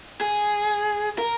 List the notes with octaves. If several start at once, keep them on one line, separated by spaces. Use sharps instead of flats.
G#4
A#4